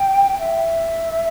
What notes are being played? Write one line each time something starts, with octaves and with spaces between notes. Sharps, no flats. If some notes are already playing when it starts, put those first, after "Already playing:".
Already playing: G5
E5